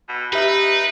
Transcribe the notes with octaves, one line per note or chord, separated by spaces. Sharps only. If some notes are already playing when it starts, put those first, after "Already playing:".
B2
D#4 G4 B4 E5